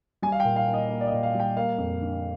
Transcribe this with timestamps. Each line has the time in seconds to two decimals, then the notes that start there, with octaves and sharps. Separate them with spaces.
0.22 G3 G#5
0.32 F5
0.40 G5
0.45 A#2
0.56 F5
0.68 A#3
0.74 D#5
0.89 A#3
1.01 D5
1.07 D#5
1.12 A#2
1.23 F5
1.35 G3 G5
1.57 A#3 F5
1.78 F2
2.01 D3